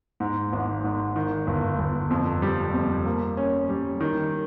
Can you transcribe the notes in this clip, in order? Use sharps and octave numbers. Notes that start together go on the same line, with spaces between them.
G#2
G#1
G#2
D#3
G1
G1
F2
G3
F2
A#3
C#4
G3
D#3